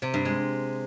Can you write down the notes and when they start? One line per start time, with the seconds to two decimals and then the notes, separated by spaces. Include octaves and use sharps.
0.02 C3
0.14 G2
0.25 G#3